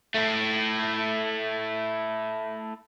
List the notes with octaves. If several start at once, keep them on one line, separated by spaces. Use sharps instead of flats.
A3 E4